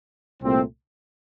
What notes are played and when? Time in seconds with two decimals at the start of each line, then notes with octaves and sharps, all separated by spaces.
0.42 C2 A#2 A3 C4